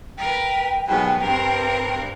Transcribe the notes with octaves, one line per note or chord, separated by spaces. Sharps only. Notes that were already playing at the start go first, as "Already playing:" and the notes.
A#4 B4 G5
D#2 G#2 B2 F#3 B3
G2 C4 A#4